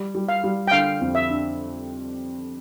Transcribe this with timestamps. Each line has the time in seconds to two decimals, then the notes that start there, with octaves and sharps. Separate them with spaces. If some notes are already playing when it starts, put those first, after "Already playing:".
Already playing: G3
0.15 G3
0.29 F5
0.44 G3
0.68 G5
0.71 D3 F5
1.01 F2
1.15 E5
1.30 D4